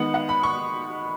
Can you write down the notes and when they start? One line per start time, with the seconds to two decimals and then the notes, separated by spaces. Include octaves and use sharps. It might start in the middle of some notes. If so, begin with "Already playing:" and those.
Already playing: D#3 G#3 B3 F#5
0.14 F#5
0.29 B5
0.43 C#6